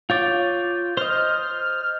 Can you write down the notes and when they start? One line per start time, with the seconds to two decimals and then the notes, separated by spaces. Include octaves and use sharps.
0.10 F4 C#5 D6 G6 A6
0.97 C5 D#5 F6